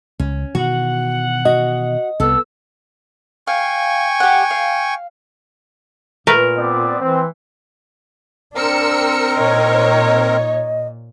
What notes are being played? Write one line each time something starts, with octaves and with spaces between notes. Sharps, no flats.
C#2 C#4
B2 D#3 E3 F#4 F#5
F#4 D#5
C2 B3 A4 E6
F5 G5 G#5 C#6
G4 F#5
F5
A#2 A3 A#4 B4
B3 C4 D5
E3 C4
C4 D4 A#4 E6 C#7
A#2 D#4 C#5 D#5